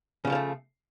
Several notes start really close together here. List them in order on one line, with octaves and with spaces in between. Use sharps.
C#3 F#3 F3 A#3 A3